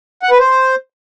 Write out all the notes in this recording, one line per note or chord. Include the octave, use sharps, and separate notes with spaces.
F#5
B4
C5